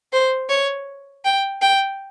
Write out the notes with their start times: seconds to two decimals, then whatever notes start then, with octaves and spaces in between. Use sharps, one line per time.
0.13 C5
0.49 C#5
1.25 G5
1.62 G5